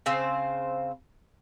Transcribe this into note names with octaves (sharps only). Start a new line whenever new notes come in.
C#3 C4 C5